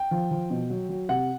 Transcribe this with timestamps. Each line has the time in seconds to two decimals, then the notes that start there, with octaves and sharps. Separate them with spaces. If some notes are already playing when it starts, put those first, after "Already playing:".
Already playing: G5
0.11 F3
0.31 F3
0.50 B2
0.70 F#3
0.89 F#3
1.09 C3 F#5